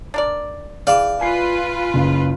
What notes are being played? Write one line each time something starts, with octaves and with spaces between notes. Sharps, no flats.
D4 A#4 D5
E3 G#4 D5 F5
F4 B4 G#5 C7
F#1 C#3